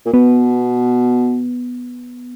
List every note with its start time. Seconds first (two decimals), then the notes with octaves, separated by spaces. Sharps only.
0.06 A#2
0.13 B2 B3